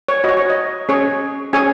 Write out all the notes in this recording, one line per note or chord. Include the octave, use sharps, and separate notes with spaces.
C#5
F#4 C#5 D#5
C#5
D#5
C#4 G#4 C#5
C#4 G#4 C#5 G#5